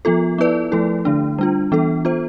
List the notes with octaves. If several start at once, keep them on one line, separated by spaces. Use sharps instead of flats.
F3 B3 F4 A4
B3 E4 B4 D5
F3 A3 E4 A4
D3 A3 D4
G3 D4 F4
E3 B3 D4 A4
B3 F4 C5